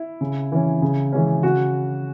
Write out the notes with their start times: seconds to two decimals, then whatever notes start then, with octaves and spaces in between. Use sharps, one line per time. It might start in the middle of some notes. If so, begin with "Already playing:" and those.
Already playing: E4
0.21 C#3
0.52 E3 C#4
0.82 C#3
1.13 E3 G#3 C#4
1.43 C#3 F#4